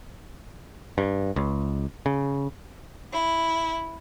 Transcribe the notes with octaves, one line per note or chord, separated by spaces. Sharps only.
G2
C#2
C#3
E4